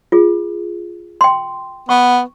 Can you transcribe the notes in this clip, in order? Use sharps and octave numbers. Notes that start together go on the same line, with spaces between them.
F4 G#4
G5 C6
B3 C#6